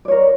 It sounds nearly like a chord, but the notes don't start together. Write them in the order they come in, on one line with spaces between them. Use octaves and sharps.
D5 C#5 A#4